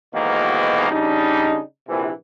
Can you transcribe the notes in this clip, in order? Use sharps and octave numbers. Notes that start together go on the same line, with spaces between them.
B1 E2 G#2 B2 D#3 A#3
C#3 G3 D4 D#4
A#1 C3 E3